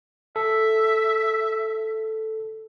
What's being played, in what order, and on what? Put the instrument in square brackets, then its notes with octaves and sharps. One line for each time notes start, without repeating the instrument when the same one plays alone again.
[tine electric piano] A4 [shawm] E5